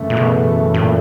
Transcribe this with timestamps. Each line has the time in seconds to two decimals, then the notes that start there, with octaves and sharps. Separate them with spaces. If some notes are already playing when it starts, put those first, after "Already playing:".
Already playing: F#2 C#3 E3 A3
0.10 A#2
0.17 B2
0.74 A2
0.81 A#2